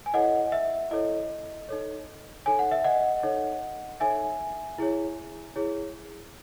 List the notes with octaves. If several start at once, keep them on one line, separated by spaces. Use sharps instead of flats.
G#5
E4 A4 C#5 D#5 F#5
E5
E4 A4 C#5 D#5
D#4 A4 C#5
D#4 A4 C#5 G#5
F#5
E5
D#5 F#5
D#4 A4 C#5
D#4 A4 C#5 E5 G#5
E4 G#4 C#5
E4 G#4 C#5